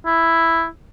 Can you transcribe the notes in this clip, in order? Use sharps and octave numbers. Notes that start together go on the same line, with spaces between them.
E4